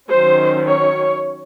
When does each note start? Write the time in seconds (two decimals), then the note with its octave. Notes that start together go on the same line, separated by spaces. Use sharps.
0.11 D#3 F#3 C#4 C5
0.68 C#5